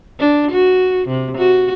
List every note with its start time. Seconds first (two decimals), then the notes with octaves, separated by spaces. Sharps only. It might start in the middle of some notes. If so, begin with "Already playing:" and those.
0.20 D4
0.51 F#4
1.08 C3
1.37 F#4